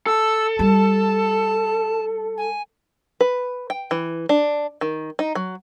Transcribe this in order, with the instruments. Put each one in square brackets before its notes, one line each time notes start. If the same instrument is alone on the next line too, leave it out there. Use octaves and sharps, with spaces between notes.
[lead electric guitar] A4 [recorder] E6
[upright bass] G3 [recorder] A5
[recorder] G#5
[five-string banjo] B4
G5
E3
D4
D#3
D#4
F#3